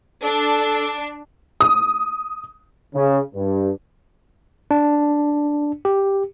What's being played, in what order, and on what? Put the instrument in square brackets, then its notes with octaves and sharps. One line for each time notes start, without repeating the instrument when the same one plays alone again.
[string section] D4 [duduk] A4
[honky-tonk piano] D#6
[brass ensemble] C#3
G2
[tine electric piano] D4
G4